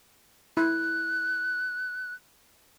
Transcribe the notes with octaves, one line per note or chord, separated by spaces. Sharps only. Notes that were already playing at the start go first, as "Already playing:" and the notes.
E4 F#6